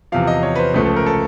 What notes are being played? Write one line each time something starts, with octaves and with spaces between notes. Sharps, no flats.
E2 C3 F3 F5
D#5
C#5
B4
C5
C#2 C#3 F3 A3 B4
A4
A#4
A4